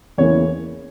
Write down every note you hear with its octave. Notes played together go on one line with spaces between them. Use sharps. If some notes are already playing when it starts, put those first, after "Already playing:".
E2 C#3 E3 A#3 C#5